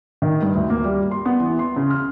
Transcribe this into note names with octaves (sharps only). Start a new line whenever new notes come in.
D#3
G2
D2
A#3
G3
C6
B3
E3
C6
C#3
F6